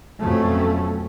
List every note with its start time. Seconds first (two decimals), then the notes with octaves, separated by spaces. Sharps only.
0.20 F2 B2 F#3 A3 C#4